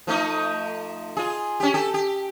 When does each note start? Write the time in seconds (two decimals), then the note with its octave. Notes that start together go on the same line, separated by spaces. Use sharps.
0.07 F3 A3 D#4
1.17 F4 G#4
1.60 C#4 G4
1.74 G4 A4
1.94 G4